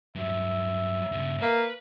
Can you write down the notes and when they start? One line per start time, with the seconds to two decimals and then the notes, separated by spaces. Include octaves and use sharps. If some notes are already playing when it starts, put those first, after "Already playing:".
0.15 G2 F#3 E5
1.12 G2 C#3
1.42 A#3 B4